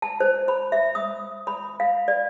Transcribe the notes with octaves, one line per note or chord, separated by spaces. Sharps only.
A5
C5
B5
E5
D#6
B5
F5
D5